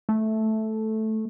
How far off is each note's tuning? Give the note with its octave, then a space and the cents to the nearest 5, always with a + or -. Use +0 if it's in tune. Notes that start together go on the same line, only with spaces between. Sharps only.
A3 -5